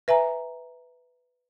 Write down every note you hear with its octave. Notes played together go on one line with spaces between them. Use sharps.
B4 E5 G#5 A#5